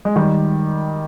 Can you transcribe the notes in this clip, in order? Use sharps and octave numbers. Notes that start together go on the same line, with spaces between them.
G#3
D#3 G3